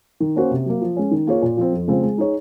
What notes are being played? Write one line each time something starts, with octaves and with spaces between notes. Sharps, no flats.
D#3
A#3 C#4 F#4 C5
C3
F#3 A#3
F3
G#3 C#4
D#3
A#3 F4 G#4 C#5
A#2
F3 C4
F2
C#3 G#3 C4 F4
G#3
D#4 G#4 C#5